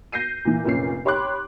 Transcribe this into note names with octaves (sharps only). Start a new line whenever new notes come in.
G6 A#6 C7 D#7
A#2 E3
F1 A#2 C#4 C7
G4 C#5 B5 C6 D6 F#6